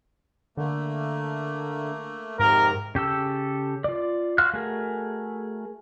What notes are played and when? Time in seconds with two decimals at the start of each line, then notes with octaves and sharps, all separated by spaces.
0.57 D3 A3 A#3
2.39 F2 G#2 C3 D#3 A#4
2.95 C#3 G4 A4 E6
3.84 F4 D5
4.38 F#4 F5 C6 F6 F#6
4.54 A3 F#4 G#4 A#4